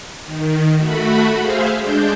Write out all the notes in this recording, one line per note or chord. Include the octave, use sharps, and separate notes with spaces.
D#3
A3 F#4 B5
G#4 C5 E5 F5
G#3 D4 G6